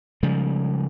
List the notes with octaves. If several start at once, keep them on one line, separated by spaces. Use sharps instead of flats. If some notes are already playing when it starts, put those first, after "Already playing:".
C#3 F3 G3 G#3